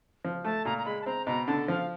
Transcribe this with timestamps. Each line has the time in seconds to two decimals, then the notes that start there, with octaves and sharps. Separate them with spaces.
0.24 F3
0.44 A3 A5
0.65 A#2 A#5
0.78 A#5
0.85 G#3 B5
1.02 A5
1.06 C4 A#5
1.26 B2 A#5
1.47 D3 A5
1.68 F3 F5